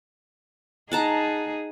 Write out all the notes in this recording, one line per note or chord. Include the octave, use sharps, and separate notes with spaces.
D#4 G#4 F#5 A5 A#5